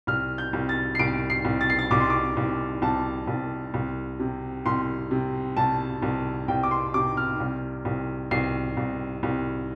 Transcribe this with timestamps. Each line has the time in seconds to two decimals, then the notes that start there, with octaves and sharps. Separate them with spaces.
0.07 C2 F6
0.38 G6
0.53 C2
0.69 A6
0.95 C7
0.99 C2 D7
1.30 C7
1.45 C2
1.61 A6
1.70 C7
1.79 A6
1.91 C2 D6
2.00 C6
2.10 D6
2.37 C2
2.82 C2 A5
3.27 C2
3.74 C2
4.19 C3
4.66 C2 C6
5.11 C3
5.57 C2 A5
6.02 C2
6.48 C2 G5
6.63 D6
6.71 C6
6.94 C3 D6
7.17 F6
7.40 C2
7.85 C2
8.31 C2 C7
8.77 C2
9.23 C2